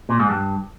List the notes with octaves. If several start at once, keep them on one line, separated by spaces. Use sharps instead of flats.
A#2
G#2
G2